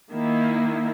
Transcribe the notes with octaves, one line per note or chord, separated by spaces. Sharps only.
D#3 A#3 E4